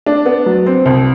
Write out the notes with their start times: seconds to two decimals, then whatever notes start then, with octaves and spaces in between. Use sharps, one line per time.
0.06 D4
0.26 B3
0.46 F#3
0.66 C4
0.85 C2